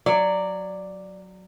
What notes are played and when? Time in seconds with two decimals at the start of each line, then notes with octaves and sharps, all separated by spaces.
0.06 F#3 D5